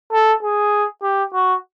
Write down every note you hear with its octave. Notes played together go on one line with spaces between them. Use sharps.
A4
G#4
G4
F#4